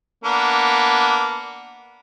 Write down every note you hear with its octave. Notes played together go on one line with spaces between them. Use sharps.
A#3 B3 D4